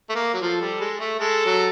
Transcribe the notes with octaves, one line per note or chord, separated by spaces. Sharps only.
A3
A#3
F#3
F3 A4
G3
G#3
A3
G#3 A4
F#3